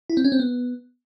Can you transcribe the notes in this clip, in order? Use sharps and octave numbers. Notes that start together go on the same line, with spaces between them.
E4
C4
C#4
C4
B3